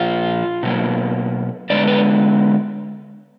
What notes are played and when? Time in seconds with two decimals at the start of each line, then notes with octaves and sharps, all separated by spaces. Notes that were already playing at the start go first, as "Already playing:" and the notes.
Already playing: A#2 F3 A#3 F4
0.63 B2 F#3 A#3
1.70 D3 G#3 B3 D5
1.87 B4